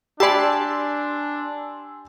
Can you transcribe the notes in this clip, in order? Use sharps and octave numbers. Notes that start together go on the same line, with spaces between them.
D4 G4 D5 G#5 A5 B5 C6 E6